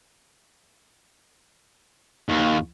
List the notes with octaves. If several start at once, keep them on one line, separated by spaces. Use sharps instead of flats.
D#2